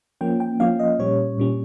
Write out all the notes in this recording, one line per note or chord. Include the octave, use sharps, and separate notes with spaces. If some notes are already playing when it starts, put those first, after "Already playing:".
F3 A#3 C#4 G5
G5
F3 A#3 C#4 F5
D#5
A#2 G3 C#4 C#5
A#2 G3 C#4